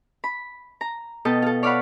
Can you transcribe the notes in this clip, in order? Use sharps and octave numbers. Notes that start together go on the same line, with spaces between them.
B5
A#5
B2 A4 D#5 G5 A5
F4 A4
C#5 D5 F5 F#5 B5 C#6